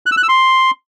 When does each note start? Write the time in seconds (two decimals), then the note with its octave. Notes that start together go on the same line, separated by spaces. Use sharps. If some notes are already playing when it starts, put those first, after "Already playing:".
0.06 F#6
0.12 E6
0.17 F#6
0.23 E6
0.29 C6